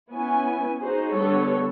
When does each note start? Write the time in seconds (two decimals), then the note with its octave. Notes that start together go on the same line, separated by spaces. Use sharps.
0.12 B3 C#4 E4 G#5
0.81 D#4 F#4 G#4 C5
1.12 D3 G3 B3 A4 C#5